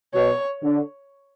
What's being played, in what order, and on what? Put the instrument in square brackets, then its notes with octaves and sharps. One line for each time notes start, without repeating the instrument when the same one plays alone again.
[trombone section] B2 [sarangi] C#5
[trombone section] D3